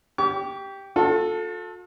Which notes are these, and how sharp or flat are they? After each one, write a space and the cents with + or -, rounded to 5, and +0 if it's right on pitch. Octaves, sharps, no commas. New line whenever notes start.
G4 +0 C#6 +45
F4 +45 A4 +0